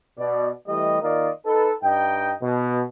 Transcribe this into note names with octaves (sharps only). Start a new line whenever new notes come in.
B2 D5
E3 G3 A3 G4 D#5
D#3 A#3 F4 A#4 D5 D#5
D#4 A4 B4
G2 D#4 D#5 G5
B2